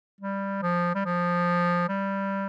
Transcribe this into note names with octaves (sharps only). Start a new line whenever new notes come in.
G3
F3
G3
F3
G3